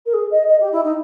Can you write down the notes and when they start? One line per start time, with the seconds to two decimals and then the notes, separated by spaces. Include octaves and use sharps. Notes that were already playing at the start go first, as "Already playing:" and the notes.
0.05 A#4
0.13 G#4
0.31 D#5
0.48 D#5
0.60 G4
0.72 E4
0.83 D#4